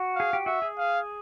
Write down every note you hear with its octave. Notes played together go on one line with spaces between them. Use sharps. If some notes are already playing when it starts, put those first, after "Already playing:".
Already playing: F#4
G#4 F5
G4
F#4 E5
G#4
F5